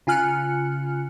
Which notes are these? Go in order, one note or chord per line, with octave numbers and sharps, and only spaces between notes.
C#3 F4 G#5 F6 F#6 C#7